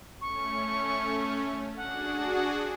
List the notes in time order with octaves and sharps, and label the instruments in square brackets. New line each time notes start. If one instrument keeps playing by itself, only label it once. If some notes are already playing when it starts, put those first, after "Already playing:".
[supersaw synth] A3 C#4 [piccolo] C#6
[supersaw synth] D4 F#4 G#4 [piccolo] F#5